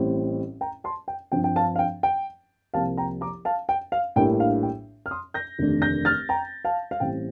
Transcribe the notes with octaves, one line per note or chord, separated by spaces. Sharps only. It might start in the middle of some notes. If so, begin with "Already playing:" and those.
Already playing: A1 A2 G3 C4
G5 A#5
A5 C6
G5
G2 F3 C4 G5
G5
F5 A5
F5
G5
G5
C2 C3 F3 A#3 F5 A5
G5 A#5
A#5 D6
F5 A5
G5
F5
A#1 A2 G3 A#3 D4 G5
F5
G5
F6
C6 D#6
G6 A#6
F1 D#2 D3 A3 D4
G6 A#6
F6 A6
G5 A#5
F5 A5
F5
A1 A2 G3 C4 G5